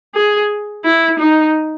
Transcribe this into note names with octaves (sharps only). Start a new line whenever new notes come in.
G#4
E4
D#4